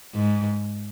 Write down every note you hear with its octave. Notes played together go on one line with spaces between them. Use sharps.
G#2